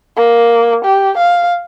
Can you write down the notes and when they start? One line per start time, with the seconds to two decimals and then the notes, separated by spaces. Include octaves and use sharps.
0.17 A#3
0.85 G4
1.18 F5